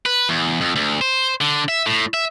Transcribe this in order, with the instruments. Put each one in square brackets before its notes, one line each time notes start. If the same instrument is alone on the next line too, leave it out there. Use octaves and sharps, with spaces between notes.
[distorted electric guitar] B4
E2
F2
D2
C5
D3
E5
A2
E5